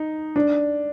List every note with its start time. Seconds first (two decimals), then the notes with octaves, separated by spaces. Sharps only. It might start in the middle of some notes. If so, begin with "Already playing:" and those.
Already playing: D#4
0.36 D4